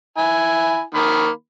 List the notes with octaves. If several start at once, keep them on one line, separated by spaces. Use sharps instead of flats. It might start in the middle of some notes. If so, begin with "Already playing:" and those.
E4 G#5
D#3 A#3 B5